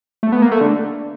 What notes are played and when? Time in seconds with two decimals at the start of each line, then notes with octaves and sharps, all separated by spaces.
0.23 A3
0.32 B3
0.42 A#3
0.51 A3
0.61 D3